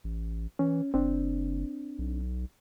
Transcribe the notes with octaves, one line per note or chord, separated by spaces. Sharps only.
A1
E3 C#4
F#1 C4 D4
B1